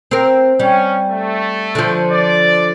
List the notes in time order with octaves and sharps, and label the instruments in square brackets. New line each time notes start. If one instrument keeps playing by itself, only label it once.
[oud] C4 A#4
[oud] G3 [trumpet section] C#4
[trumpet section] A3
[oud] D3 F3
[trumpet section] D5